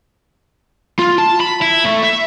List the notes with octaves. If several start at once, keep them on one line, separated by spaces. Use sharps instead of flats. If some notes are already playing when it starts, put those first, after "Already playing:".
F4
A5
B5
E4
A3
E5